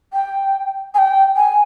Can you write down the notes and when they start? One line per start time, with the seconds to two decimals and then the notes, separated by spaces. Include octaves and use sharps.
0.13 G5
0.94 G#5
0.98 G5
1.36 G#5